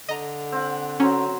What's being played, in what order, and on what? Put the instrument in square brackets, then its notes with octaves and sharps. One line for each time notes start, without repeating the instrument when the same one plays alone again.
[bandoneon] D3 [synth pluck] D#5 A#5
[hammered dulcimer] C4 F#5
[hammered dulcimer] F#3 C5 [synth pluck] C#4